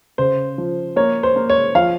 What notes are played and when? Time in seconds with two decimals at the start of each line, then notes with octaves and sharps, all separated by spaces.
0.18 C#3 C5
0.58 F3
0.96 A#3 C#5
1.23 C5
1.36 A#3
1.50 C#5
1.75 F3 F5